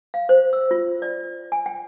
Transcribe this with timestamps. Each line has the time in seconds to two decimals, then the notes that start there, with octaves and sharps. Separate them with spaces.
0.14 F5
0.29 C5
0.53 E6
0.71 F4
1.02 D5
1.52 G#5
1.66 G5